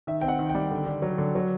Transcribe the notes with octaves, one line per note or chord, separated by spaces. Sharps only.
D#3 E5
C4 G5
F#5
D#3
G5
G3
D3
D3
F#3
D3
F#3